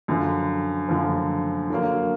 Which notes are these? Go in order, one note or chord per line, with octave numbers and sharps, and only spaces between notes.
F#2 D3 F3
F#2 D3 F3
D3 F#3 A#3